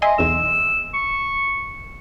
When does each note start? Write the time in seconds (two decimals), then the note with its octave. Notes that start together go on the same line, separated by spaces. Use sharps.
0.02 D#5 E5 G#5 C6
0.18 B1 E2 E6
0.94 C#6